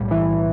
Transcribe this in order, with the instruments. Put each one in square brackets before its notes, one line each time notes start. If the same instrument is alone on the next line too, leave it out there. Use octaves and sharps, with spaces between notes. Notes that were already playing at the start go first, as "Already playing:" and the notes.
Already playing: [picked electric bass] B1 A2 G3
[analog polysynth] E3